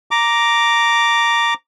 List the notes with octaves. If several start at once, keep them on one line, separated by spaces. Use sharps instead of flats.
A#5 D6